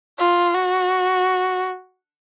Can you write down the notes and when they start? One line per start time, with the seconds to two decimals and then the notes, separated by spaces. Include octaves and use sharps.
0.19 F4
0.54 F#4